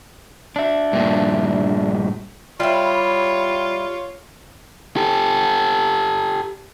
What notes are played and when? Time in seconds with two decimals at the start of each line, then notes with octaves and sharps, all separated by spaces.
0.56 D4 E5
0.93 G2 A#2
2.60 G3 E4 F4 C#5
4.96 G4 A4